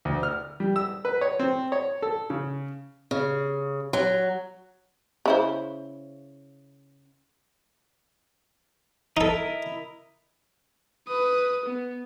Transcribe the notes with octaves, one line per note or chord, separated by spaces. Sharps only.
D2
F6
G3
E6
B4
C#5
C4
C#5
A4
C#3
C#3
F#3
C#3 E4 C5
D#4 E4 A4 A#4 D#5
B4 D#6
B3